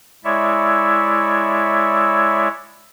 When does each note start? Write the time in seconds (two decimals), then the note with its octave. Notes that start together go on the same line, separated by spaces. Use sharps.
0.24 G#3 E4 C#5 D5 E5